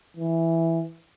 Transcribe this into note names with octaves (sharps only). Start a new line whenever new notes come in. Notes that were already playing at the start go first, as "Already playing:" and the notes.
E3